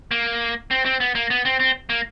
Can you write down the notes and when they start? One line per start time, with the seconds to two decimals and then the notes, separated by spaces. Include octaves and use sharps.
0.11 A#3
0.71 C4
0.85 C4
1.00 B3
1.15 A#3
1.30 B3
1.45 C4
1.60 C4
1.90 A#3